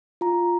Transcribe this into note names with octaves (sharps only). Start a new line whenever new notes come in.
F4 A#5